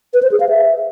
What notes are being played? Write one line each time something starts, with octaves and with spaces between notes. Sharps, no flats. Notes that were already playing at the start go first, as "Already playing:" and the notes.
B4
C5
G#4
F5
E5